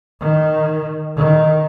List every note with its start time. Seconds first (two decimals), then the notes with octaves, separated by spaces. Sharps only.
0.20 D#3
1.16 D#3